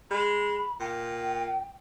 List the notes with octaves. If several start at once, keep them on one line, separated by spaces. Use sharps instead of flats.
G#3 B5
A#2 G5